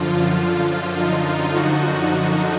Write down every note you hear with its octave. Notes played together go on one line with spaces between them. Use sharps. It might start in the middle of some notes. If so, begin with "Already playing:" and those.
Already playing: F#2 D3 F3 F4
F#2 D3 F3 F4
D#4
F4
F#2 D3 F3 D#4 F#4
D#4 F#4